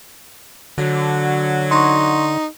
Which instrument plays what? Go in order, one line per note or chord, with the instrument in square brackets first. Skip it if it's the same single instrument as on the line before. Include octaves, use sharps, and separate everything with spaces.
[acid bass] D3 [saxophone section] F#3
[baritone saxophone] D#4 [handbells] C6 C#6